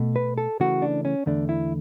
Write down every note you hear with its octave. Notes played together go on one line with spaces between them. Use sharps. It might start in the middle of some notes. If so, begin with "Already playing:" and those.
Already playing: B2 A3
B4
A4
C#3 E3 A3 F#4
D4
C#4
E2 D3 A3 D4
E4